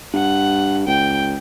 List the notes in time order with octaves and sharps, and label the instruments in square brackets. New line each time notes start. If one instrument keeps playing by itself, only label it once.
[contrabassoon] G2 [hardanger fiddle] F#5
[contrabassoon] C#2 [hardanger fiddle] G5